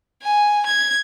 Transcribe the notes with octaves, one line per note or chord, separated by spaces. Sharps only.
G#5
G#6